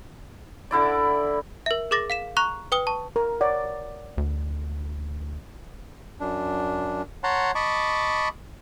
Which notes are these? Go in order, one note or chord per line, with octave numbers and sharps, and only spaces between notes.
D3 E4 D5
A#4 E5
G#4 A#4 D6 A6 A#6
F5 B6 E7
A#5 C#6 F#6 F7
B4 G5 D#6 G7
A5 C#6
A#4
C#5 D5 F#5
D2
F#2 D4
C#5 F#5 A5 A#5 C6
D#5 A5 B5 C#6 D6